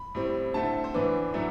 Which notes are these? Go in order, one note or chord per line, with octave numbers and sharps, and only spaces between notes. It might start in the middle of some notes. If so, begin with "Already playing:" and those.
Already playing: B5
A2 G3 C4
D3 A3 C4 A5
C5
A2 E3 B3 D4 B4
A2 F#3 A3 D4